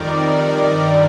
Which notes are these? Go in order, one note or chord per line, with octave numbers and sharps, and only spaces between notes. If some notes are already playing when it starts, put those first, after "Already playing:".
Already playing: F2 D#3 G3 A#4 D5
G2 D#3 G3